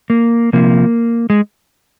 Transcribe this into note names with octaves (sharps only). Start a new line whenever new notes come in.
A#3
C3 F3 A#3
G#3